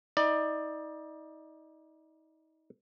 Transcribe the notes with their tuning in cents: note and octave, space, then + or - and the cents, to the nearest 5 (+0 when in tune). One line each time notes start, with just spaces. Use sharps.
D#4 +35 D5 +20